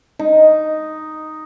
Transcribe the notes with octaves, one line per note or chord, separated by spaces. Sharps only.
D#4